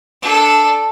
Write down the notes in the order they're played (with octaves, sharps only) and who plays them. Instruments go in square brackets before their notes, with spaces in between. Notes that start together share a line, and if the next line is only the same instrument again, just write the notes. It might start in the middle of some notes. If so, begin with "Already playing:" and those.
[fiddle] D4 A4